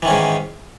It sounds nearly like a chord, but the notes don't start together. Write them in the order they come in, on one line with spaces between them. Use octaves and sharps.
E3 D#3 C#4 G#2